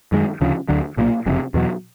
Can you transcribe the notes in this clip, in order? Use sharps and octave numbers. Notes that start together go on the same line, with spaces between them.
F#2 D#3 G#3
D2 C#3 F3
D2 D3 F#3
B1 A#2 F3 A#3
F#1 F2 C3
E2 B2 F#3